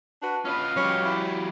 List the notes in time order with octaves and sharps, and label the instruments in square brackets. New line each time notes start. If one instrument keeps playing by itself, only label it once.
[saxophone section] D4 F#4 B4
[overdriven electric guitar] C#4 B4 [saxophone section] F4 D#5 F5
[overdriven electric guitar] F#3 G4 [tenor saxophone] C#4
[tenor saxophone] E4